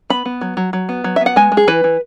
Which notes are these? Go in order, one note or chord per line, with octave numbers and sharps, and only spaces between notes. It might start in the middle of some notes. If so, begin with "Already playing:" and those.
B3 B5
B3
F#3
F#3
F#3
B3
F#3
E5
B3
F#5
G#3 G#5
G#3
G#4
E3 B4
E3